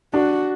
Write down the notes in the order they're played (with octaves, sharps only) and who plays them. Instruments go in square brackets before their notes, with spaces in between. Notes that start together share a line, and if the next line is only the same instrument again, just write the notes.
[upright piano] D4 [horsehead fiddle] F#4